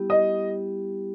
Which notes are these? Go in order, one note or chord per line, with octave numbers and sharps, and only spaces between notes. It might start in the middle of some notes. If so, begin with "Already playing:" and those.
Already playing: G3 B3 E4 G4
D#5